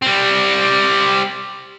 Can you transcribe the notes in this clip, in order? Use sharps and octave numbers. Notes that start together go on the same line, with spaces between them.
G3 C4